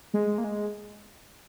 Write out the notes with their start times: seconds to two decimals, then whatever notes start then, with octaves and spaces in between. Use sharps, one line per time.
0.14 G#3
0.38 A#3
0.44 G#3